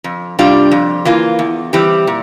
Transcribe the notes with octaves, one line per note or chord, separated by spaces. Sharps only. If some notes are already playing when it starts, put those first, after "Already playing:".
F2
C3 G3 D4 F4
F2
E3 A#3 F4
E2
E3 G3 C4 G4
A#2